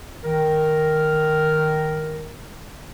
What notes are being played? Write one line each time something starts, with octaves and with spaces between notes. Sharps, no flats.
D#3 A#4